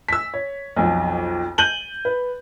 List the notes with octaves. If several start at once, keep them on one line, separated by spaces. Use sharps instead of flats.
E6 B6
C#5
B1 F2
G6 D#7 F#7 G7
B4